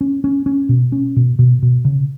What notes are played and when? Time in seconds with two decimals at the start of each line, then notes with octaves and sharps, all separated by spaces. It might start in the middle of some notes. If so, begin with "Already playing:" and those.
0.01 C#4
0.24 C#4
0.46 C#4
0.69 B2
0.92 C#4
1.16 B2
1.39 B2
1.62 B2
1.85 C#3